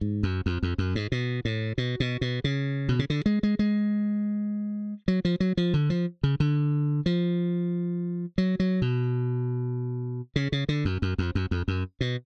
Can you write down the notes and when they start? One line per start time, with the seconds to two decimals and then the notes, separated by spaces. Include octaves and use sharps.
0.01 G#2
0.23 F#2
0.46 F2
0.63 F2
0.78 F#2
0.95 G#2
1.12 B2
1.45 A2
1.78 B2
2.00 B2
2.21 B2
2.44 C#3
2.89 B2
2.99 C#3
3.10 D3
3.26 G#3
3.43 G#3
3.59 G#3
5.08 F#3
5.25 F3
5.40 F#3
5.57 F3
5.74 D3
5.90 F3
6.23 C#3
6.40 D3
7.06 F3
8.38 F#3
8.60 F#3
8.82 B2
10.36 C#3
10.52 C#3
10.69 D3
10.85 F#2
11.02 F#2
11.18 F2
11.35 F#2
11.51 F2
11.68 F#2
12.01 B2